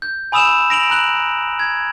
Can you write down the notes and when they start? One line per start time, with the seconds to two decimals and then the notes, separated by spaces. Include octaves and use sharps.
0.02 G6
0.32 G#5 B5 D#6 E6 E7 F7
0.70 A#6 D7 F7 F#7
0.90 A#5 F#6 F#7
1.59 G#6